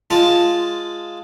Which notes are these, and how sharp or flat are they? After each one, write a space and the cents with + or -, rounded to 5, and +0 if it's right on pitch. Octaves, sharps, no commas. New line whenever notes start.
G#3 +0 F4 +0 A5 +0